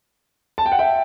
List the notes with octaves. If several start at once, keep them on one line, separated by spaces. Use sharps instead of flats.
A5
G5
F#5
E5 G5